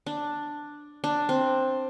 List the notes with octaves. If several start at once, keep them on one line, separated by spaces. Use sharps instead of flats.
D4
D4
C4